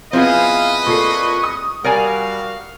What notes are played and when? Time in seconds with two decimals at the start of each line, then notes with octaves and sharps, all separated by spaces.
0.13 F3 B3 C4 E4 G#4 B4 D#5 F5
0.86 A#2 A4 C#6 C7
1.44 D#6
1.84 G3 F#4 A#4 D5 F5 G#5